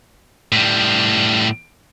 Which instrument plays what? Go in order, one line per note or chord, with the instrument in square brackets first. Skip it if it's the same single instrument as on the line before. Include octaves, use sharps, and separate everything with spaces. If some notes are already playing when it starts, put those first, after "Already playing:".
[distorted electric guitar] A2 G3